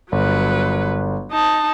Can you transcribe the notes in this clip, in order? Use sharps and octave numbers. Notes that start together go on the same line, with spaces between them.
G1 F#3 B4
D#4 A5